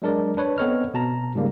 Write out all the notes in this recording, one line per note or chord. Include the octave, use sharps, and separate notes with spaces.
F#3 G#3 D4 A#4 D5
D4 B4 C#5
B3 C4 A4 C#5 D#5 F6
B2 A5 A#5
G#2 C#3 G3 A#3